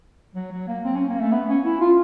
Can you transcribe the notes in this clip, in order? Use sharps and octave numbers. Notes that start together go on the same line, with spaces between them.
F#3
F#3
A#3
C4
C#4
A#3
A3
B3
C#4
E4
F4